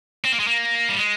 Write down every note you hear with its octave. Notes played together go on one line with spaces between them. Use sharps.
C4
A#3
G#3
A#3
G3
G#3